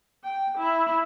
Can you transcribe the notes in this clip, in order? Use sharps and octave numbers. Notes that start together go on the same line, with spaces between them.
G5
E4